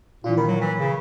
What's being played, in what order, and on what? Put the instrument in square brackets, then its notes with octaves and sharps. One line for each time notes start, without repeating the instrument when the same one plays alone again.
[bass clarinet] A#2 [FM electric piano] E3 D4 F4
[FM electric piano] A#2 A#4 B5 [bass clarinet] D#3
[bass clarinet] F#3
E3
C#3